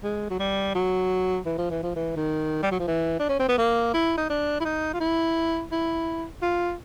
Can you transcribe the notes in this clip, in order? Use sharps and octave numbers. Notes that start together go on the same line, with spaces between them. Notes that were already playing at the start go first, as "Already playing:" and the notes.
G#3
F#3
G3
F#3
E3
F3
E3
F3
E3
D#3
G3
F#3
F3
E3
D4
C#4
C4
B3
A#3
E4
D#4
D4
E4
D#4
F4
E4
E4
F4